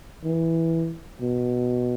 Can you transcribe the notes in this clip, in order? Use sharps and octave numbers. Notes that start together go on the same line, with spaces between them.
E3
B2